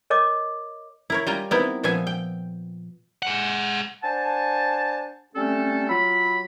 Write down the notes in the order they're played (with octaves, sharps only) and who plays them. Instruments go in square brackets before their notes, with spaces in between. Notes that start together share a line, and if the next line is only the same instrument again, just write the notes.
[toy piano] A#4 C#5 D#5 D6
[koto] E4 A#4 C#5
G3 F4 G5 G#5 A#5
B3 C4 D#4 E4 A#4
A#2 F3 B3 E5 G#5
G5
[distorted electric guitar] G#3 F#5
[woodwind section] D4 C5 F#5 G#5 A5
G3 A3 C4 C#4 A4
F#3 F4 B5